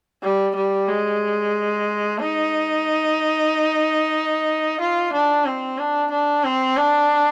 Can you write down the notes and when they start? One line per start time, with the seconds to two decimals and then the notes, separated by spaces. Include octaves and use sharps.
0.23 G3
0.56 G3
0.88 G#3
2.19 D#4
4.81 F4
5.13 D4
5.46 C4
5.79 D4
6.11 D4
6.44 C4
6.77 D4